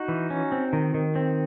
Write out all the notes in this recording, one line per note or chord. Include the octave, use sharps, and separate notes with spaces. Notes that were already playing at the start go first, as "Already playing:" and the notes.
Already playing: D#4 F#4
E3
C#4
C4
D#3
D#3
C4